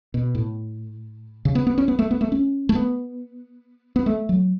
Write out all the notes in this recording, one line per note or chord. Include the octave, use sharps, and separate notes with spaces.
B2
A2
C#3
B3
B3
C#4
B3
A3
B3
A3
C#4
A3
B3
B3
A3
F#3